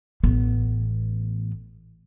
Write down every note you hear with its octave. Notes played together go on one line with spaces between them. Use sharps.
A1 B3